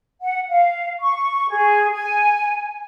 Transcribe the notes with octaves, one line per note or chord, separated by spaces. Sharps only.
F#5
F5
C#6
G#4
G#5